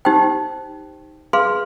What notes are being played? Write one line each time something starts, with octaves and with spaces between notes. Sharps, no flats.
D#4 G4 C5 G5
G#4 B4 F5 C6